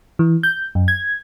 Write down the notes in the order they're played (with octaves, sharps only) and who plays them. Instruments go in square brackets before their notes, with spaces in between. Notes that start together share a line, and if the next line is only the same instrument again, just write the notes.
[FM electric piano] E3
G6
F#2
G#6